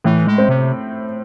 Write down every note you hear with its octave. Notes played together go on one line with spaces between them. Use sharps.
A2 E3
G#3
C4
C3